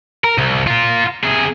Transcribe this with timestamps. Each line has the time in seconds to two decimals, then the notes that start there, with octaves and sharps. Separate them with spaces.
0.24 A#4
0.38 C2
0.67 F4 A#4
1.24 C3 G#4